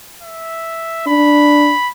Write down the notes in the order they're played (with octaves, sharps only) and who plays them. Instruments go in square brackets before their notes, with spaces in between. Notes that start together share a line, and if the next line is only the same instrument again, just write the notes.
[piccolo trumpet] E5
[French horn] D4 [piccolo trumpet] B5